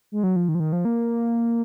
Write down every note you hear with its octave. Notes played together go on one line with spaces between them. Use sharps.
G#3
F#3
F3
D#3
F3
D#3
F3
A#3